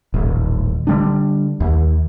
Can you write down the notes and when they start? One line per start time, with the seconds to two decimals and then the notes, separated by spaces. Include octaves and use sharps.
0.14 D#1 A1
0.87 D3 G3 D4
1.60 D#2